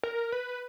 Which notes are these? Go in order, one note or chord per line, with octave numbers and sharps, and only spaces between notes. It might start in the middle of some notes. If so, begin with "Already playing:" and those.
A#4
B4